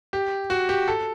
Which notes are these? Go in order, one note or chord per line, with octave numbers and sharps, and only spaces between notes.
G4
F#4
G4
A4